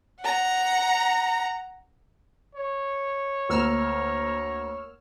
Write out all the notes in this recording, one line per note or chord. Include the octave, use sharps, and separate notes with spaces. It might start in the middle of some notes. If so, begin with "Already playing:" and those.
F#5 A#5
C#5
D2 A#3 A#5 E6 F6